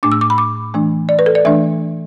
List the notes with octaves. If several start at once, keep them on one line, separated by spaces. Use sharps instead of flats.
A2 A3 D4 D6
E6
D6
B5
D6
E3 A3 D4
D5
B4
A4
D5
E3 A3 D4 E5